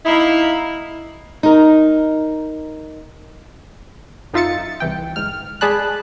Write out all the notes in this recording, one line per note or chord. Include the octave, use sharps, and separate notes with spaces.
A#3 D#4 E4
D#4 A#4
F#2 D#4 F4 E5 A6 C#7
C2 E3 G5
G1 G#2 F6
G#3 G#4 D5 A5 B5 F#6